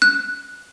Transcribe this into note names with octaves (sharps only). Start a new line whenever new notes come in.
F#6